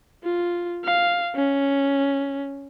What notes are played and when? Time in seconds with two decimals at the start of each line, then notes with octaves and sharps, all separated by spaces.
0.24 F4
0.85 F5
1.36 C#4